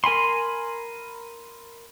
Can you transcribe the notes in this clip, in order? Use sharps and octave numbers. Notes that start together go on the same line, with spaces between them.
A#4 G#5 B5 C6